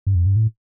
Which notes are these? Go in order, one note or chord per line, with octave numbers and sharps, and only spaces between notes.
G2
F2
G2
A2